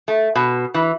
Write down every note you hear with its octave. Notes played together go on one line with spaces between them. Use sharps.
A3
B2
E3